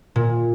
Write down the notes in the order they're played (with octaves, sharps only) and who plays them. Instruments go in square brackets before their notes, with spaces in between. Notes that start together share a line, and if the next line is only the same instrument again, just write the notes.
[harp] A#2